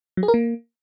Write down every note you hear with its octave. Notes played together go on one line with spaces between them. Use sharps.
F#3
G#4
A#4
A#3